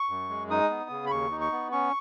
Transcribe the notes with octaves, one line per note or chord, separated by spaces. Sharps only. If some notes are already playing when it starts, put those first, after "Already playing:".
Already playing: C#6
F#2
G#3
D#4 D#6
B3
C#3
B5
D#2 C#6
D#4
C#6
B3
C#4 C#6